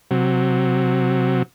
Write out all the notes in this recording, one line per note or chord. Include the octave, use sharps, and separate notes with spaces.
C3 F#3